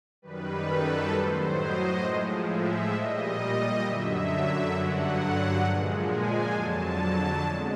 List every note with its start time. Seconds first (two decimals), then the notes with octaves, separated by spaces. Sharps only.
0.22 F#2 D#3 G3 B4
0.67 A4
1.12 A2 F#3 C5
1.57 D#5
2.03 A2 F3 G#3
2.48 E5
2.93 A#2 G3 D#5
3.82 F#2 D3 F#3 E5
4.73 G2 D3 F#3 F#5
5.64 A#2 F3 G#3
6.08 G#5
6.54 F2 D3 F#3 A5
7.44 B2 G#3